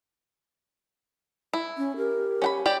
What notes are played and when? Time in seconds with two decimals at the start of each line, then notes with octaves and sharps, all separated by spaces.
1.53 E4
1.78 C#4
1.97 G4 A#4
2.42 C#4 F#5 B5
2.66 G4 C#5 D5